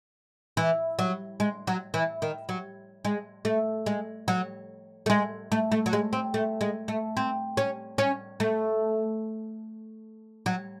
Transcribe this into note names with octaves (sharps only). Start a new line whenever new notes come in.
E3
F#3
G#3
F#3
E3
D#3
F#3
G#3
A3
G#3
F#3
A3
G#3
A3
A3
F#3
G#3
C4
A3
G#3
A3
C4
C#4
C#4
A3
F#3